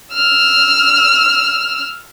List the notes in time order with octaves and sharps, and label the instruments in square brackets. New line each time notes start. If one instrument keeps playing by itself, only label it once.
[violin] E6 F6